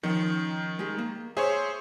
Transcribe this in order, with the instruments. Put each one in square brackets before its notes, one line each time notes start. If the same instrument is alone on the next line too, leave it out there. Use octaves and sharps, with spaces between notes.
[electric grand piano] D#3 [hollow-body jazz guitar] F3 C#4 G5
[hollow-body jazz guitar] G#3 G4
A#3
[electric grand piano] G#4 C5 C#5 [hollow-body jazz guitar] E5